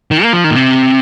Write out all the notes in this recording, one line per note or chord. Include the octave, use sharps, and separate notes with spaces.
D#3
A#3
F3
D#3
A#2
C3